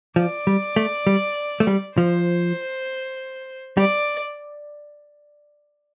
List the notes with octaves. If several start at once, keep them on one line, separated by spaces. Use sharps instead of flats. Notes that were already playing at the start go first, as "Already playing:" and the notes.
F3 D5
G3
A3
G3
A3
G3
F3 C5
G3 D5